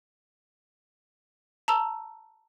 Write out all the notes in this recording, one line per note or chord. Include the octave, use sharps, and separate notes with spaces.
A5 A#5 E6